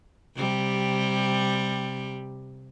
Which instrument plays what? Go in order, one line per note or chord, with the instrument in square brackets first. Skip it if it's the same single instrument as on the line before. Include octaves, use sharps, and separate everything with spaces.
[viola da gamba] C3 G3